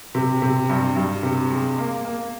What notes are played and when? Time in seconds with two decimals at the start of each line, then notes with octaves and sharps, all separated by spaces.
0.15 C3
0.42 C3
0.70 G2
0.96 G2
1.23 C3
1.51 G#3
1.78 A#3
2.05 A#3